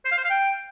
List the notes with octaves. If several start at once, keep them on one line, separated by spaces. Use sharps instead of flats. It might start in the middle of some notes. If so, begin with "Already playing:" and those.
C5
F5
C5
F5
G5